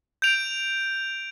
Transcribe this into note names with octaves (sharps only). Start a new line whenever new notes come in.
G6 D7 F7